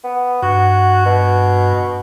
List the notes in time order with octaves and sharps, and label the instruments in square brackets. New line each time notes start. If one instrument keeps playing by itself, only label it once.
[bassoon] B3
[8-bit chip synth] G2 [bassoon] F#4
[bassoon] B2